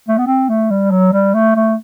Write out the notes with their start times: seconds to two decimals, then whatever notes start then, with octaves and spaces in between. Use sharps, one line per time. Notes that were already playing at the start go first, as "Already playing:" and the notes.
0.08 A3
0.18 B3
0.27 C4
0.49 A3
0.70 G3
0.91 F#3
1.13 G3
1.34 A3
1.55 A3